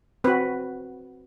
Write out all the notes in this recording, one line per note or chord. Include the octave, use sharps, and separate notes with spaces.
C4 F#4 B4